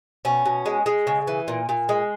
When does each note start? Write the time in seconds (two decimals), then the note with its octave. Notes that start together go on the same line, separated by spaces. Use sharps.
0.25 B2 C#4
0.45 B2
0.66 G#3
0.86 G#3
1.07 C#3
1.27 E3
1.48 A#2
1.69 A#2
1.89 G#3